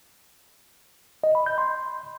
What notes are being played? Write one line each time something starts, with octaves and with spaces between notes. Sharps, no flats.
D#5
B5
G6
C6